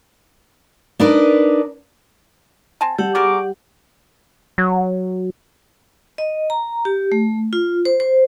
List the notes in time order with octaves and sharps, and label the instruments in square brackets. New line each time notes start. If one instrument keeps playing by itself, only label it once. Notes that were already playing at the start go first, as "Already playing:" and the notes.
[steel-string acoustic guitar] D4 D#4 A#4 B4 D5
[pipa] C4 G#5 A5
[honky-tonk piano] G3 [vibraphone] G4 F#5 [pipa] A4
[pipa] B3 F#4 A#4 [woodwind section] G#4 C#6 D6
[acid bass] F#3
[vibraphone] D#5
A#5
G4
A3
F4
C5
C5